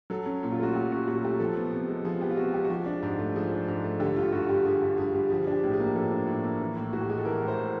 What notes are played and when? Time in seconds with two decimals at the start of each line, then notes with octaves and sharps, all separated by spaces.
0.10 F#3 A4
0.26 C#4
0.43 A#2
0.51 F4
0.59 A3 F#4
0.75 F#3 G4
0.91 C#4 F#4
1.07 A#2 F#4
1.24 A3 G4
1.40 F3 A4
1.57 B3
1.72 C3
1.88 G#3
2.05 F3 G#4
2.21 B3 G4
2.30 F4
2.37 C3 F#4
2.54 G#3 G4
2.64 F#4
2.70 F3 G4
2.86 D4
3.03 G#2
3.19 A3
3.36 F3 G#4
3.52 D4
3.68 G#2
3.84 A3
4.00 D3 G4
4.16 G2 F4
4.32 G2 F#4
4.49 G3 G4
4.66 D3 G#4
4.82 G2
4.98 G2 G#4
5.14 G3
5.30 F3 G#4
5.47 D4 G4
5.64 A2
5.73 G#4
5.80 A#3
5.95 F3 A4
6.12 D4
6.27 A2
6.44 A#3
6.61 E3
6.77 A2
6.93 A2 F#4
7.01 G4
7.09 G#3 G#4
7.17 A4
7.25 E3 A#4
7.42 A2
7.48 C5
7.58 A2